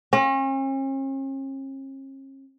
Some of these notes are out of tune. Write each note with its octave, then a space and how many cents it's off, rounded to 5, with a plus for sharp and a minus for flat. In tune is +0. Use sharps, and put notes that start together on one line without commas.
C#4 -45